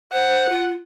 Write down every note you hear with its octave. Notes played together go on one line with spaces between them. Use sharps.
C5 F#5
F4